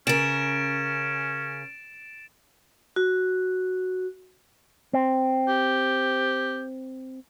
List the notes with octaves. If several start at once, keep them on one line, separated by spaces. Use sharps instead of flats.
C#3 C#4 A#4 A6 D7 E7
F#4
C4
G4